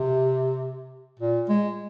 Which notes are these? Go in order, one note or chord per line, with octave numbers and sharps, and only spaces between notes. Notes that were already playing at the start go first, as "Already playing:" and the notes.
Already playing: C3
A#2
G#3